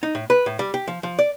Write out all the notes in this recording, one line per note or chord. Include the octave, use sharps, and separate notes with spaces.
D#4
A2
B4
A2
G3
G4
F3
F3
D5